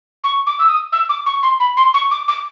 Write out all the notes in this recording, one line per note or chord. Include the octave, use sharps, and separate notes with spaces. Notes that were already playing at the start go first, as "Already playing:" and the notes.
C#6
D6
E6
D#6
E6
D6
C#6
C6
B5
C6
C#6
D6
D6